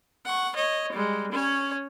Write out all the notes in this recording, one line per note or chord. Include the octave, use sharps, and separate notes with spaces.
F#5 C#6
C#5 D#5
G3 G#3
C#4 C#5